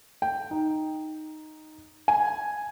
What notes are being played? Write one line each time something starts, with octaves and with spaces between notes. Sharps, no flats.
G5
D#4
G#5